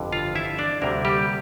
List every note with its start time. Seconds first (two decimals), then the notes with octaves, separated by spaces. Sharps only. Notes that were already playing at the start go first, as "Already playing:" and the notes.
Already playing: G1 F2 D3
0.12 F4 F5
0.35 E4 E5
0.58 D4 D5
0.82 D2 C3 G3 A#3 A#4
1.05 G3 G4